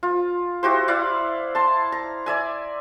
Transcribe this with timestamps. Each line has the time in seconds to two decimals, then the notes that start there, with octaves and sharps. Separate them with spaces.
0.03 F4
0.63 E4 F#4 G4 C5
0.88 E4 D5 F5 F#5
1.55 A5 C6
1.92 A#5
2.26 D5 E5 G#5